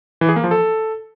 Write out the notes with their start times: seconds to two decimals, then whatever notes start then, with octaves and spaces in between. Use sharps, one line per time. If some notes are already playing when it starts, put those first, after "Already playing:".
0.21 E3
0.29 G#4
0.36 A#3
0.44 F3
0.51 A4